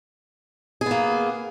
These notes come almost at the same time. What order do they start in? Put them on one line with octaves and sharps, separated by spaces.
G#4 B3 A#3